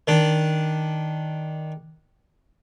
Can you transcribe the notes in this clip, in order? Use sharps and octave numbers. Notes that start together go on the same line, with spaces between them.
D#3 D4